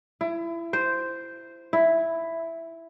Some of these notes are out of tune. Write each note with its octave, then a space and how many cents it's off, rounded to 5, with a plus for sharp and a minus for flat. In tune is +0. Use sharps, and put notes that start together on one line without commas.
E4 +30
C5 -5
E4 +5